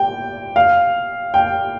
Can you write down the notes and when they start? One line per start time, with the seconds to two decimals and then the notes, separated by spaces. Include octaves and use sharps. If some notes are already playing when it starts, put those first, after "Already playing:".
Already playing: G5
0.56 F5
1.34 G5